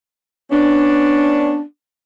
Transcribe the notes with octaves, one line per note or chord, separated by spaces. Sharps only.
B3 C#4 D4